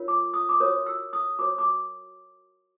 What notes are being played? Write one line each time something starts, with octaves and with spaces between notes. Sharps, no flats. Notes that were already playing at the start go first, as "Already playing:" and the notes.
Already playing: F4 A#4 C#5
D6
D#6
D6
F#4 A#4 C#5 D#6
E6
D#6
F#4 A#4 C#5 D6
D6